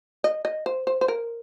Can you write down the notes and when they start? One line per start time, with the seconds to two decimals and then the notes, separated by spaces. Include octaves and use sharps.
0.24 D#5
0.45 D#5
0.66 C5
0.87 C5
1.01 C5
1.08 A#4